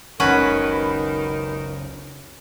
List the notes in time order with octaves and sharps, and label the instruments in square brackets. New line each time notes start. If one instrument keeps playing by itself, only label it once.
[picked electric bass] F#1 C#2 [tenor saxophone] D#3 [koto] C#4 F#4 B4